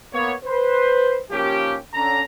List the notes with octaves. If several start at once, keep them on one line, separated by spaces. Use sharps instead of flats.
A#3 B3 C#5
B4 C5
D#3 F3 A#3 C#4 G4
D3 C#4 A#5